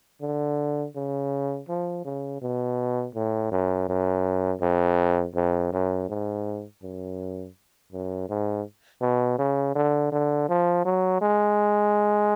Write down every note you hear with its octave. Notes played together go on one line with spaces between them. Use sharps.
D3
C#3
F3
C#3
B2
A2
F#2
F#2
F2
F2
F#2
G#2
F#2
F#2
G#2
B2
C#3
D3
D3
F3
F#3
G#3